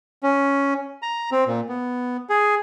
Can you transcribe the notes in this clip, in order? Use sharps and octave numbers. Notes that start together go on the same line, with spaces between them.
C#4
A#5
C4
A#2
B3
G#4